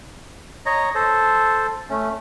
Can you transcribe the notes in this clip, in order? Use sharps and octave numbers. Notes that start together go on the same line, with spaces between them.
C#5 D#5 A#5
A4 C5
A3 C#4